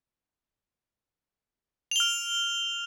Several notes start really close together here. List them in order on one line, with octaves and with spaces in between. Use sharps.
F7 G7 F6